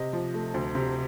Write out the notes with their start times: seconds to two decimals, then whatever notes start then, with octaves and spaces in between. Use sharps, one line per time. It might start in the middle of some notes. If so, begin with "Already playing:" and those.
Already playing: C3 D#5
0.13 F3
0.34 A3
0.54 D2
0.75 C3